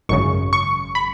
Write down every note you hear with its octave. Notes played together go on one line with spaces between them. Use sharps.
G#1 F#2 C#3 C#6
C#6
B5